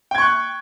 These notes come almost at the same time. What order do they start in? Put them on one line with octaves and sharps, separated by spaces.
G5 G#6 C#6 F#6